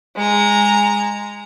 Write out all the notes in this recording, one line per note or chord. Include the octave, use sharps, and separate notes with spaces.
G#3 A#5